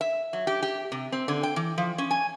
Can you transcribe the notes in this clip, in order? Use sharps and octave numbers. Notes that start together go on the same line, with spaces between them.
E5
F#3
G4
G4
C3
C4
D3
G5
E3
F3
C#4
G#5